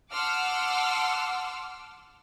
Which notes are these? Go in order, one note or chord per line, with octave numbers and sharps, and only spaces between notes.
F#5 A5 C6 D6 E6 F6